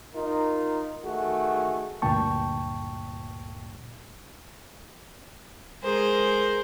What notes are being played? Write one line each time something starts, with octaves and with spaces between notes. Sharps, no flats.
D#4 F4 A#4
D#3 A3 F#4 G#4
D2 G2 A#2 G5 A5 C#6
G#3 G#4 A#4 C5